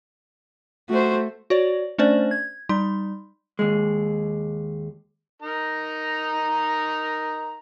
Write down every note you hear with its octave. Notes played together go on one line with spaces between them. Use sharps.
A3 F#4 C5
F#4 C#5 D5
A3 C#4 D4 C5 D5
G#6
G3 D#4 C6
D#2 G#3
D#4 A#4 A#5